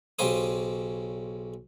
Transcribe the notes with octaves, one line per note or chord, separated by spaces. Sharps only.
B1 C#3 G4 C5 D#6